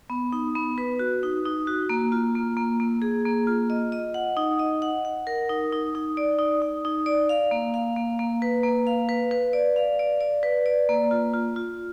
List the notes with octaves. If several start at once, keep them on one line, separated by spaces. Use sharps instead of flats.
B3
D#4
B3
B4
F#4
D#4
D#4
F#4
A#3
F4
A#3
A#3
A#3
G#4
A#3
F4
D#5
D#5
F#5
D#4
D#5
F#5
F#5
A#4
D#4
D#4
D#4
D5
D#4
D#4
D#4
D5
F5
A#3
F5
A#3
A#3
B4
A#3
F5
B4
B4
D5
F5
D5
D5
B4
D5
A#3
F4
F4
F4